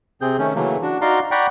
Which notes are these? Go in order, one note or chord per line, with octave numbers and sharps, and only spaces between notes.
C3 C4 G#4 G6
D#3 A3 C#4
C#3 E3 F#3 A3 A#3
D4 F#4
D#4 F#4 D5 F5 A#5 C6
D5 F#5 G5 A#5 B5 C#6